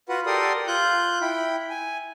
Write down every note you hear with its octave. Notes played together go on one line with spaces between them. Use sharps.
F4 F#4 B4 F#5
G4 A4 A#4 D5 C6 D#6
F4 F#6 G6
E4 G5 B5
G#5